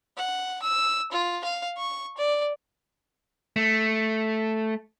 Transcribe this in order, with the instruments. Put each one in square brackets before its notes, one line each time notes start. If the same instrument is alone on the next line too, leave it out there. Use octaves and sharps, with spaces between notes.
[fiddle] F#5
E6
F4
F5
C#6
D5
[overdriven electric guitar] A3